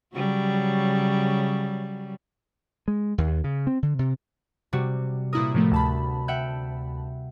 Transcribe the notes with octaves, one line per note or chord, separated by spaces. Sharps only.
C#3 F#3 G3
G#3
D#2
C#3
C4
D3
C3
C3 G3 F#4
A#2 E4 A#4 D#6
A2 F3 A3
D2 A5 B5
E5 F#5 G5